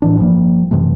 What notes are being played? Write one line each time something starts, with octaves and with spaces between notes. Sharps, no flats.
A2 E3 D4
G1 F3 G3 A#3
F#2 C3 E3 A3